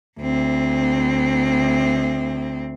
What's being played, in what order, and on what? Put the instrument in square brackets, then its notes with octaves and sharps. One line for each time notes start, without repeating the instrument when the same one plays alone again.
[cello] D2 C4